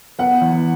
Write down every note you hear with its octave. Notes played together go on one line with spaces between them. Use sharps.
B3 F#5
E2